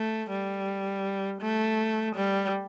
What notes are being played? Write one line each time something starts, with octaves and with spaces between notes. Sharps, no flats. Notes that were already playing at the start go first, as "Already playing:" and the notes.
Already playing: A3
G3
A3
G3